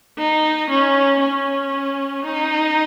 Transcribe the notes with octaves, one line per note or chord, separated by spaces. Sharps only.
D#4
C#4
C#4
D#4